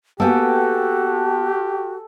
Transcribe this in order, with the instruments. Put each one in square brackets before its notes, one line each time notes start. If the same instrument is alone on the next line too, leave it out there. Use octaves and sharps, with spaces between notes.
[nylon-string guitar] A#3 B3 [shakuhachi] F#4 [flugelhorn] G4 [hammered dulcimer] A4 G5 G#5